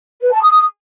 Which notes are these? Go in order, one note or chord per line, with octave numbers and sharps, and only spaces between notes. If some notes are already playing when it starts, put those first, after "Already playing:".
B4
A5
D#6